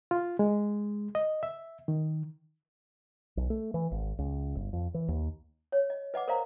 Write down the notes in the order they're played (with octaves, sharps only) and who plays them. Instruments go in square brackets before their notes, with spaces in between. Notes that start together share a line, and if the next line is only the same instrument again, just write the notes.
[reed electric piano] F4
G#3
D#5
E5
D#3
[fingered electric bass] B1
A3
E3
G#1
C#2
G1
F2
E3
D#2
[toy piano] C#5
D#5
B4 D#5 F#5 D6
A#4 C5 D5 D#5 F5 A#5